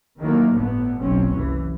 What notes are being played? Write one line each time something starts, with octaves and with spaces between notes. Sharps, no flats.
D#3 E3 F#3 A3 A#3
G1 A2 D3 B3
F#1 B1 F#2 C4 C#4
C2 E3